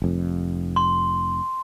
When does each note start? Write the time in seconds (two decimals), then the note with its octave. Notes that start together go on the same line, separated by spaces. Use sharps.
0.02 F1 F2
0.76 C6